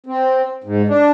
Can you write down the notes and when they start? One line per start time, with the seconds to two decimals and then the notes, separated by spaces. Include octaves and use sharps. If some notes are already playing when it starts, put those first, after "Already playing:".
0.06 C4
0.64 G#2
0.89 D4